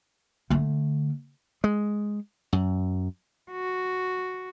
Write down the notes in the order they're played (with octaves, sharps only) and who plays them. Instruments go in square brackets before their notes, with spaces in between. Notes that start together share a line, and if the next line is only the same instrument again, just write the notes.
[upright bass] D3 A3
[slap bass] G#3
F#2
[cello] F#4